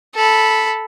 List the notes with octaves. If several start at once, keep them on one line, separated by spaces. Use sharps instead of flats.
A4 B5